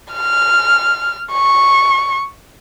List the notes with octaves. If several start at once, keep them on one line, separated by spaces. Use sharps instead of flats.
F6
C#6